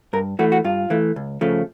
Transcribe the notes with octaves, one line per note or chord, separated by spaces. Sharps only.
G2 A#4
E3 A3 F#4
F#4
G2 F4
E3 A3
C#2
C#3 F3 A3